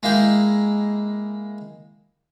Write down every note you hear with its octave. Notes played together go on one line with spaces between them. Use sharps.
G#3 A#3 E4 G5